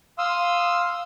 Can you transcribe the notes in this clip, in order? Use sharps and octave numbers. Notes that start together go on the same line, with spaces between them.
F5 C6 D#6 E6